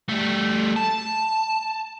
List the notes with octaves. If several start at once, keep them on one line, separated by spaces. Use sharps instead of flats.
G3 A3
A5